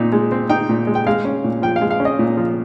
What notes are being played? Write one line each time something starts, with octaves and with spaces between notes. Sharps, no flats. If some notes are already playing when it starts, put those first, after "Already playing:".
Already playing: A#2 C4 D#4
G#3
C4
D#4 G5
A#2
G#3
G5
G#3 F5
C#4
A#2
F3 G5
F5
G#3
F5
C#4
D#5
A#2
F3